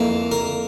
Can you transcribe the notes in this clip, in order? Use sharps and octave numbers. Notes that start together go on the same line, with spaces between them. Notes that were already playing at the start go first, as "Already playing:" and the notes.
Already playing: F2 E3 A#3
A#4